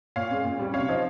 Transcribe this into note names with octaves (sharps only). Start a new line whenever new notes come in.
A#2 C#5 F5
G#3 C#4
A#2
G3 C#4
C3 C#5 F5
F3 C4 D#4